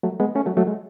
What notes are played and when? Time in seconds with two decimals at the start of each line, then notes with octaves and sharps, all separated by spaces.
0.03 F#3 A3
0.20 G#3 B3
0.35 A3 C#4
0.46 F#3 A3
0.57 F#3 A3
0.67 G#3